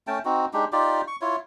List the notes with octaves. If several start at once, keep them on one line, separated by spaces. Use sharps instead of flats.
A3 C#4 G5 A5
C4 D#4 F#4
G#3 D4 D#4 G4
D#4 F4 G4 D5
C#6
E4 F4 C#5